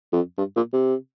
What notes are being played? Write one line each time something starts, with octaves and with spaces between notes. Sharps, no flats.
F2
G2
A#2
C3